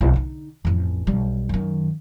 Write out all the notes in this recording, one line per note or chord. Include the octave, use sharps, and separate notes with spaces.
B1
D3 D#4
A1 F2
B1 G3
F#2 D#3